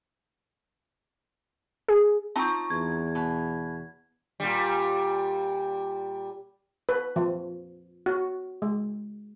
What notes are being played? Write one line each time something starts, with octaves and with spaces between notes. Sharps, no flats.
G#4
C4 D#4 F4 A5 C#6
E2 G#6
B2
A#2 G3
B4
F3
F#4
G#3